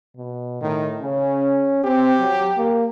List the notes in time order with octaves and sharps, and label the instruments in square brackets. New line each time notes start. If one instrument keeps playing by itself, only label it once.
[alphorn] B2
[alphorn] A2 [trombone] D#3
[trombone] C#3 [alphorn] C#4
[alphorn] C4 [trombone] G4
[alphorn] F#3
A#3